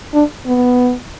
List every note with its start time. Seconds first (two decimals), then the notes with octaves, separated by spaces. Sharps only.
0.14 D4
0.47 B3